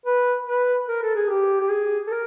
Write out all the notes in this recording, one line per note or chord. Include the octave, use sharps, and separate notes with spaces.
B4
B4
A#4
A4
G#4
G4
G4
G#4
A4
A#4